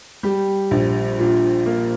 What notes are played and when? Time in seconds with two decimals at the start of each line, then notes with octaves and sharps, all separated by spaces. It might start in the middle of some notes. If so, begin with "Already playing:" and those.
0.23 G3 G4
0.71 A#1
1.19 A#2
1.66 A#3